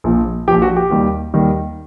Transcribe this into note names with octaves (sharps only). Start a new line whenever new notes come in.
A#1 A#2 F3
A#1 A#2 F3 G4
F#4
G4
D#2 D#3 G3
D#2 D#3 G3